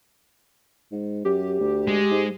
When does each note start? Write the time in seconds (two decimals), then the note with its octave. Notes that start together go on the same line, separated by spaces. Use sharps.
0.92 G#2
1.25 F#2 G4
1.60 D2
1.88 G#3
2.11 G#2